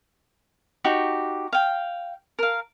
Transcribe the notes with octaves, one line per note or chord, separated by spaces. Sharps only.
D#4 F#4 G4
F5 G5
A#4 F5